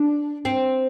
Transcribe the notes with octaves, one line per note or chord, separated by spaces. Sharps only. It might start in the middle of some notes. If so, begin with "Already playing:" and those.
Already playing: D4
C4